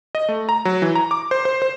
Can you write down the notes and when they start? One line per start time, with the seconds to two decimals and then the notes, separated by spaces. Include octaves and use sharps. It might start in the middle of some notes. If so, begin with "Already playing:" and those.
0.15 D#5
0.29 A3
0.49 A#5
0.65 F#3
0.82 E3
0.95 A#5
1.11 D6
1.31 C5
1.45 C5
1.62 C5